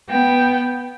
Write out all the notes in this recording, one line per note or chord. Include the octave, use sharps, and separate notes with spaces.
B3 G5